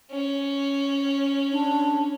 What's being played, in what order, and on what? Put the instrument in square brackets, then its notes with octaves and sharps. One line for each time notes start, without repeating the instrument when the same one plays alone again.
[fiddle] C#4
[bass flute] D4